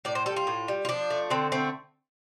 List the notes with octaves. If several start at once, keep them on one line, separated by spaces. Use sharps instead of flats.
A2 D5
C5
G3 A4
F4
A2
G3
F4
F3 D4
A3
D3 C4
A3 C4